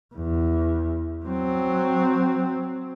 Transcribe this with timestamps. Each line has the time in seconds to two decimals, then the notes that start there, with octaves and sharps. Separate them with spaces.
0.15 E2
1.25 F#3 C4